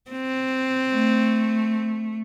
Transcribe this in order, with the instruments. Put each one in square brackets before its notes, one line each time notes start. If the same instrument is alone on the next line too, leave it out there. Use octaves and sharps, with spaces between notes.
[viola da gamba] C4
[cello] A3